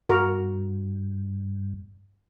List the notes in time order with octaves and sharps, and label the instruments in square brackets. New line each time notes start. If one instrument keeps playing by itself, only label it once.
[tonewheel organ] G2 [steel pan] F#4 A#4